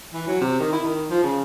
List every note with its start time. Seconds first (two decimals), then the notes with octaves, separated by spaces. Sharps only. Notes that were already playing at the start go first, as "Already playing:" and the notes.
0.14 E3
0.27 F#3
0.41 C3
0.60 D#3
0.72 E4
0.85 D#3
1.10 F3
1.23 C#3